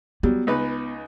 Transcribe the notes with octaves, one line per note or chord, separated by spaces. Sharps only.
F#3 G3 B3
C#2 D#4 B4